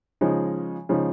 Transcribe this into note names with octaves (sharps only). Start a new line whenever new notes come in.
C#3 F3 G#3 D#4
C#3 F3 G#3 D#4